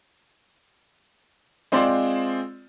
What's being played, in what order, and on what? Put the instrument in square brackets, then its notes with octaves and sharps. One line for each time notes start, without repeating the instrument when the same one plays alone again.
[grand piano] G#3 C4 F4 C5 D5